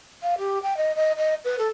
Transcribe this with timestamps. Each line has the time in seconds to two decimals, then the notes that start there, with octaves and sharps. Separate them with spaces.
0.23 F5
0.38 G4
0.63 G5
0.77 D#5
0.96 D#5
1.17 D#5
1.45 B4
1.59 A4